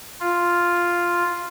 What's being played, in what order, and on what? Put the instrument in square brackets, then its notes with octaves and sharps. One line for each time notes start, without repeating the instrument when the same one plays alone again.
[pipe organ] F4